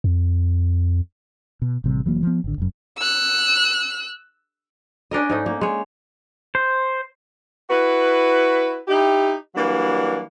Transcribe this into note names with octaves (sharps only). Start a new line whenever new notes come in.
F2
B2
A1 C3 G3
F1 E3 F#3 A#3
F3 B3
G#1 D3
F1 F#2
E6 F#6
C#4 D4 A#4 D#5
G#2 A3 D#4
A#3
G#3 C#5
C5
E4 F#4 B4
D#4 E4 G4
E3 F#3 G3 A#3 D4